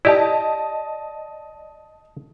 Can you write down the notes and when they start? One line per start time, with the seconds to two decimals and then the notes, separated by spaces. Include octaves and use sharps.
0.05 E4 G4 D5 D#5 A5